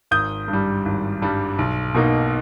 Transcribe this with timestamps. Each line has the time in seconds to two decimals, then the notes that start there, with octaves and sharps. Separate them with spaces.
0.11 G#1 D#6 G6
0.48 G2
0.53 G3
0.86 G#1
1.22 G2 G3
1.58 B1
1.95 B2 A#3 D#4